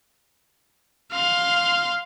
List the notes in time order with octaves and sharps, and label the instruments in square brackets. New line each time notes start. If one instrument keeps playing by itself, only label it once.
[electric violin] F5 C6